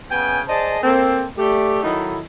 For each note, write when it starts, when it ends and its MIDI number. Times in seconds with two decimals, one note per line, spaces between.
0.11 0.40 49
0.11 0.40 59
0.11 0.40 79
0.11 0.40 80
0.48 0.77 68
0.48 0.77 72
0.48 0.77 74
0.48 0.77 75
0.48 0.77 81
0.82 1.24 58
0.82 1.24 60
0.82 1.24 69
1.37 1.82 57
1.37 1.82 67
1.37 1.82 74
1.83 2.19 51
1.83 2.19 54
1.83 2.19 63
1.83 2.19 64
1.83 2.19 69
1.83 2.19 83